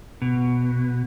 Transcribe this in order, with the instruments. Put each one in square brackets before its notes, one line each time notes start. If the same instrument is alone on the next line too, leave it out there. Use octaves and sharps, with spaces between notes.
[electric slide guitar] B2